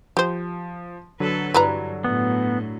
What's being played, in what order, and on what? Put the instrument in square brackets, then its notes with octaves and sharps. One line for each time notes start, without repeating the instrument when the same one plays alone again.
[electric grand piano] F3 [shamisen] G4 C5
[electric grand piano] D3 F#3 [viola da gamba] A4 B4
[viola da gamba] G2 [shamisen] E3 B4 A#5
[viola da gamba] A2 [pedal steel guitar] B3